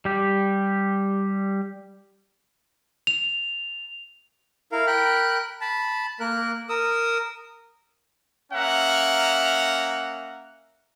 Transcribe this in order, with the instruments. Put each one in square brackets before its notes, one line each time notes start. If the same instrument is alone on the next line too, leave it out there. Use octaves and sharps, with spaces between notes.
[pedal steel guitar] G3 G4
[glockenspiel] F7
[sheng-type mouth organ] E4 A#4 F5
A#4 G5 B5 F#6
A5 B5
A#3 A#4 F#6
A#4 D#6 E6
[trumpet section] A#3 C#4 E5 F#5 A#5